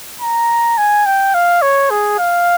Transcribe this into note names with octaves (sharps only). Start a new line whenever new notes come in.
A#5
G#5
G5
F5
C#5
G#4
F5